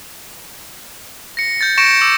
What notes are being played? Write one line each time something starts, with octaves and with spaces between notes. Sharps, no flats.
A#6 C#7
G6 A6
C#6 A#6 C#7 D7 E7
D6 E6